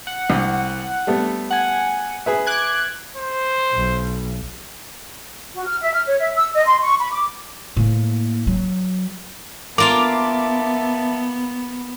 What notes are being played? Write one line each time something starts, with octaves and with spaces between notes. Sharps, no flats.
F#5
C2
G3 A3 B3
F#5 G#5
G#4 B4 E5
D6 F#6 G#6
C5
B1
F#4
F6
E5
F6
C#5
E5
E6
D#5
C6
C#6
B5
D6
A2 A#3
F#3
A#3 B3 F4 E5 F5 A5 D6